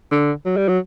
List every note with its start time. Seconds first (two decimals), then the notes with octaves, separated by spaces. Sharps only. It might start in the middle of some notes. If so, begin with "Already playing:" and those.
0.11 D3
0.45 F#3
0.57 G3
0.68 F#3